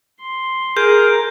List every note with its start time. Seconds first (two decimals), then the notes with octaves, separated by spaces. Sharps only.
0.21 C6
0.77 G#4 A#4 G6